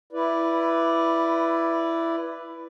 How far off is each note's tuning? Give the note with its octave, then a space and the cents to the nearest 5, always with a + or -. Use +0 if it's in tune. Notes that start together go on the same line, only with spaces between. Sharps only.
E4 +15 B4 +0 D5 +0